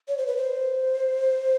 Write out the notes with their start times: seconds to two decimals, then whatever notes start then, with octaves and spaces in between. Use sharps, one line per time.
0.08 C#5
0.18 C5
0.27 B4
0.37 C5